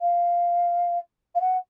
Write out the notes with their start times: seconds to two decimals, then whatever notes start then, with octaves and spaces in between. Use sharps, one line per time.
0.01 F5
1.34 F5
1.40 F#5